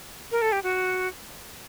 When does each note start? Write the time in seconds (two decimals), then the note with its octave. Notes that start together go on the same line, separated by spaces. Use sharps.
0.32 A#4
0.42 A4
0.52 G4
0.63 F#4